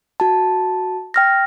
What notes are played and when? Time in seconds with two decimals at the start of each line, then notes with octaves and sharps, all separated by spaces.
0.20 F#4 A5
1.14 G5 F6 A#6